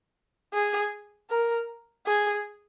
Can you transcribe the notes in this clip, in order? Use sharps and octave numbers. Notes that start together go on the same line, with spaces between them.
G#4
A#4
G#4